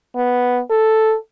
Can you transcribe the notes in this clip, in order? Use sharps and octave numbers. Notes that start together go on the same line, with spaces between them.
B3
A4